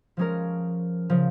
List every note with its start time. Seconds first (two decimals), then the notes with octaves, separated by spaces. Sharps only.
0.17 F3 G#3 C#4 A#4
1.10 C#3 F3